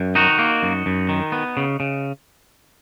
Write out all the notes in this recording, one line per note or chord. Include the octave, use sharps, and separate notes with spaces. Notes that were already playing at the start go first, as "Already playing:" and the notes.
Already playing: F#2
D#3 D#4 F#4
A#3
F#2
F#2
D#3
B3
C#3
C#3